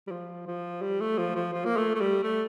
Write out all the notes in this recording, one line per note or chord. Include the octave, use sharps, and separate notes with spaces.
G3
F3
F3
G3
A3
F3
F3
F3
A#3
A3
A3
G3
A3